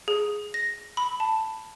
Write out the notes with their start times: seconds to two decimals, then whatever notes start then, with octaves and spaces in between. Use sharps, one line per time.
0.08 G#4
0.54 A#6
0.97 B5
1.20 A5